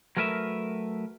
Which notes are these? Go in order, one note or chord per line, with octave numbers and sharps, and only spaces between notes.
F#3 A3 A#4 B4 E5